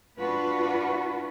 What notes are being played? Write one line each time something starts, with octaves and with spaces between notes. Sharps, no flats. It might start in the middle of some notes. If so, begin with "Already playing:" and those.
D4 F4 F#4 B4